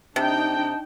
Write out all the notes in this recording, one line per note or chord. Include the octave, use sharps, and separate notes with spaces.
C3 D4 D#4 G5 A5